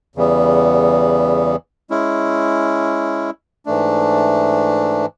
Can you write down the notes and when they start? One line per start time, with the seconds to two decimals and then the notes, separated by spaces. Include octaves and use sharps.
0.16 E2 C#3 E3 G3 B3
1.90 G#3 C#4 E4
3.66 G#2 E3 A3 D4